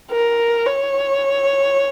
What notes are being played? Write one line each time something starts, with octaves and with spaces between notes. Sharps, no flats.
A#4
C#5